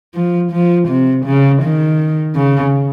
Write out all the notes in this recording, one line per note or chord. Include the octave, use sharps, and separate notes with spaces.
F3
F3
C3
C#3
D#3
C#3